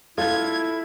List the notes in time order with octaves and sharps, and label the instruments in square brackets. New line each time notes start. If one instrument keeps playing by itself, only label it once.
[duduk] E4 [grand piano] F4 [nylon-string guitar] A4 [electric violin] G#6